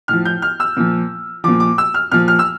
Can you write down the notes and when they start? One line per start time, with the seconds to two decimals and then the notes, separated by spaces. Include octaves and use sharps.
0.08 A2 F3 F6
0.25 G6
0.42 F6
0.60 E6
0.77 A#2 F3
1.44 A#2 F3 D6
1.60 D6
1.78 E6
1.94 F6
2.12 A#2 F3 F6
2.28 F6
2.39 E6